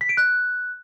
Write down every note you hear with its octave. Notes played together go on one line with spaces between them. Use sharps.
B6
D7
F#6